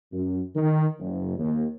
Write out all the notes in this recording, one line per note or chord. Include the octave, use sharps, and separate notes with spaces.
F#2
D#3
F#1
D#2